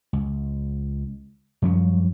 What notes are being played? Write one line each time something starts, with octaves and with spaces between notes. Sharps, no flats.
C#2
F#2 F3 G3 C#4